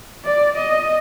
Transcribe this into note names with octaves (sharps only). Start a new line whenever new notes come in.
D5
D#5